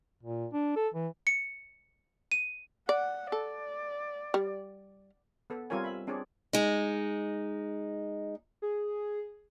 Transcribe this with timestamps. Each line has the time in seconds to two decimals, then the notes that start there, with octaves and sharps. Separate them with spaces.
0.23 A#2
0.53 D4
0.76 A4
0.94 E3
1.27 C#7
2.32 D#7
2.89 D5 F#5
3.32 A4 D5
4.34 G3
5.50 B3 A4 B4
5.70 G3 C4 F4 A#4 C#5 G#5
5.84 B4 E5 B5
6.07 C4 D4 G#4 C#5 D5
6.53 G#3 D#4
8.62 G#4